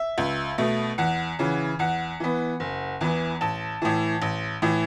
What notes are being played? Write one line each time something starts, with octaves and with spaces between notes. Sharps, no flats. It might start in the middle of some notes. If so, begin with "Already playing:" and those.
Already playing: E5
C#2
B2 A3
E2 F#5
C#3 E3
E2 F#5
E3 B3
F#1
E2 E3 B3
A1 A5
A2 E3
A1
A2 E3